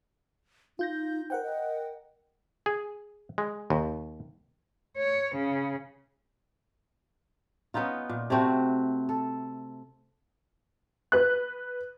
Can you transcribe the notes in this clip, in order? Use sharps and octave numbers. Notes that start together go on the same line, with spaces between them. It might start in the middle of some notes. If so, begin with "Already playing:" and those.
D#4 F4 G6 A#6
A#4 C5 F#5 G5
D#5
G#4
G#3
D#2
C#5
C#3
B3 C#4 D#4 F4
A#2
C3 A3 C4 F#4
A4
B4 F#6